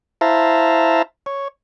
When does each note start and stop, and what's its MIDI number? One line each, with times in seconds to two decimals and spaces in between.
0.21 1.02 64
0.21 1.02 72
0.21 1.02 76
0.21 1.02 77
0.21 1.02 81
0.21 1.02 82
1.26 1.48 73